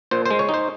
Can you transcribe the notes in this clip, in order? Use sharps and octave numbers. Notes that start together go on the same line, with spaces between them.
A#2 C5
G#3 C5
C#5
D#4
C5